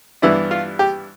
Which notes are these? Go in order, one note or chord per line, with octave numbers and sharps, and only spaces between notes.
G2 E3 B3 D4 E4
F4
G4